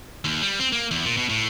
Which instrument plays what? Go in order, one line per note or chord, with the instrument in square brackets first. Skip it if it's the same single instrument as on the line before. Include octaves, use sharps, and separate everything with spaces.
[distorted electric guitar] D#2
G3
C4
A#3
E2
A#2
B2
A2